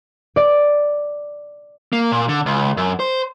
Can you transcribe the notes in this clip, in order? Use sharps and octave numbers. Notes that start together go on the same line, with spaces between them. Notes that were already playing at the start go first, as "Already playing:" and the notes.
D5
A#3
A#2
D3
C#2
F#2
C5